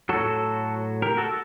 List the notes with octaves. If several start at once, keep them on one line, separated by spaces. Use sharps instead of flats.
A2 F#3 F#4 A4
G4 A#4
F#4 A4